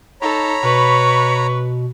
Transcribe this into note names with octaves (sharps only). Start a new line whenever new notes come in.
D#4 A4 C#5 A#5 B5
B2 B4 C#6